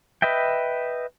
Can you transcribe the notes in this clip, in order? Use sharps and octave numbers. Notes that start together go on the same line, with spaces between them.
B4 D#5 E5 G5